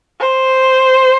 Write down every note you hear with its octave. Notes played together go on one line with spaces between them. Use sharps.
C5